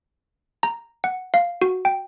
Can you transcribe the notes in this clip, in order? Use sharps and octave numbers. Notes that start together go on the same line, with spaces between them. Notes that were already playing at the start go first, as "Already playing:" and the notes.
A#5
F#5
F5
F#4
G5